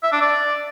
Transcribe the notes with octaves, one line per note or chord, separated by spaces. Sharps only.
E5
D4
D5